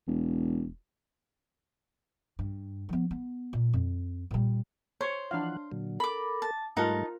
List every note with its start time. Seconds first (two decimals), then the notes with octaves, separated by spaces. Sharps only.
0.07 E1
2.39 G2
2.89 F3 B3
3.11 B3
3.53 A#2
3.73 F2
4.31 A#2 G3
5.01 C5 C#5
5.31 E3 F3 D4 F5 F#5
5.72 A#2 D3 F#3
6.00 A4 A#4 B5 D6
6.42 A5
6.77 G#2 G3 A3 D#4 F4 A#4 F#5 A5